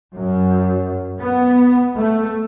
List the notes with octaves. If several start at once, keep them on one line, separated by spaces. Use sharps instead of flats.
F#2
B3
A3